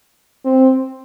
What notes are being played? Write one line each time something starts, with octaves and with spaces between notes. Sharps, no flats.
C4